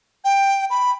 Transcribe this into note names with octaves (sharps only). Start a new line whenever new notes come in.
G5
B5